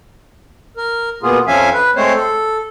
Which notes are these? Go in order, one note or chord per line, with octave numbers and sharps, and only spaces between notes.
A#4
B2 A#3 B3 F4 G#4
F2 F3 C#4 E5 F5 G#5
B4
G#3 A3 C4 C5 C#5
A4